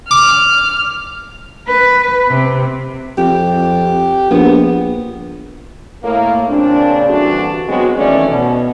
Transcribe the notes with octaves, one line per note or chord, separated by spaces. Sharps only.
D6 F6
B4
C3
F2 G4
A#1 B3
A2 A#3
A#2 C#3 C4 D4
G2 D3 E3 D4 F#4
F#3 G#3 B3 C4 F#4
D#3 E3 A3 C#4 C#5 D5
B2